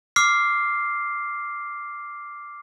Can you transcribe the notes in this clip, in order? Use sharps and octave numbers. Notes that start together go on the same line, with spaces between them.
D6 F6 C7